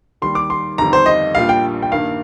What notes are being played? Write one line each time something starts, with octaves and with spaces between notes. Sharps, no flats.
D#2 D#3 G3 C6
D6
C6
G1 F2 D#3 G3 A#5
C5
D#5
A#1 A#2 G3 D4 F4 F5
G5
G5
G2 D#3 A#3 F5